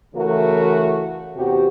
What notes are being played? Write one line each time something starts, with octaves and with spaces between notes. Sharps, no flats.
C#3 E3 A3 F#4 A#4
E2 C3 F#4 G4